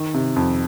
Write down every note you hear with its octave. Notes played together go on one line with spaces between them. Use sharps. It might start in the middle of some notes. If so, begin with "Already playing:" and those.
Already playing: D#3
C3
F2